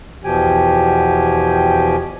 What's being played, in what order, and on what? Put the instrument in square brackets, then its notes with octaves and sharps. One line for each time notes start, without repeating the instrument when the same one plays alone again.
[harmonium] E2 B2 F3 G4 G5 G#5